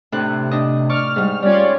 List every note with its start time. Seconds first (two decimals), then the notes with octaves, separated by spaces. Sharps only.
0.12 A2 C3 D4 F#6
0.51 D4 D#5
0.89 D5 C#6 F6
1.16 G#2 G3
1.43 G3 C#4 F4 C#5 D5